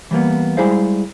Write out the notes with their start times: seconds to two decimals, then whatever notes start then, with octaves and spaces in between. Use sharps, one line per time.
0.11 E3 G3 A#3 B3
0.57 G3 G#3 E4 G#4 C5 F5